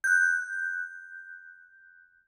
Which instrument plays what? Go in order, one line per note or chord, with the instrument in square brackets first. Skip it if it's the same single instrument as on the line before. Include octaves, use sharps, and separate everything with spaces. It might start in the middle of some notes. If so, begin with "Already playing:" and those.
[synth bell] F#6 G6